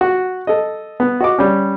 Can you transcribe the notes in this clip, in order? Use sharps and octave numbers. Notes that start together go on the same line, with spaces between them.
F#4
A4 D#5
B3
F#4 D#5 D6
G3 C#4